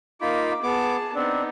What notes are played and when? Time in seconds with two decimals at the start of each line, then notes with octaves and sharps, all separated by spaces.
0.21 A#3 D#4 F4 B5 D6
0.63 B3 G#4 A5 D6
1.15 B3 C4 D4 D#4